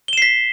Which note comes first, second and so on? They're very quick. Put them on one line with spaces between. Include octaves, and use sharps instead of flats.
G7 E7 C7 B6